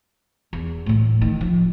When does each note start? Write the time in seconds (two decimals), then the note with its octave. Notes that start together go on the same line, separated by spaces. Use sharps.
0.53 E2
0.86 A2 E3
1.21 D#3
1.41 F3